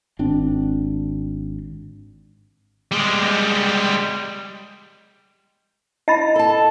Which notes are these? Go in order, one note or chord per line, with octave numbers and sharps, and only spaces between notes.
G#1 C4 D4
G3 G#3
E4 D#5 B5 A6
A4 A5